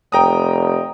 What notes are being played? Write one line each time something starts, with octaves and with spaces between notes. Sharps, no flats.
F1 G5 A#5 D#6